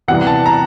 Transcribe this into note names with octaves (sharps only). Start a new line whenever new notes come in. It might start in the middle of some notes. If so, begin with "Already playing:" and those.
E2 C3 E3 G3 F#5
A5
A#5